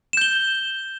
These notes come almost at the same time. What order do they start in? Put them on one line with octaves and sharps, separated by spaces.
E7 G6 G7